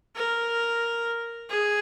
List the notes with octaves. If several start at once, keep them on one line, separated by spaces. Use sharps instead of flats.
A#4
G#4